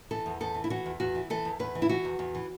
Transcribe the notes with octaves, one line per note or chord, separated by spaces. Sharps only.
E3 A4
E2
E2 A4
E3
E4
E3 F#4
E2
E2 F#4
E3
E3 A4
E2
E2 B4
E3
E4
E3 F#4
E2
E2
E3